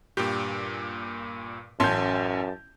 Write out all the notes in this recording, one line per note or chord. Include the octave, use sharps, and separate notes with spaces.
G2 A#2 G4
A1 F#2 C#4 A5 C6 G6